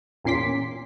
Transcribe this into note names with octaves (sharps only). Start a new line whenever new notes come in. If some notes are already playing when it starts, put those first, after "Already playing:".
E2 A#2 C#4 C6 D6 B6